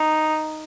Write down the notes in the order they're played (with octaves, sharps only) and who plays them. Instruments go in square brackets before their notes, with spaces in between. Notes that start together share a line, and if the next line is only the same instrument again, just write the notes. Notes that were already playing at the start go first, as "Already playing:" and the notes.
Already playing: [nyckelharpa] D#4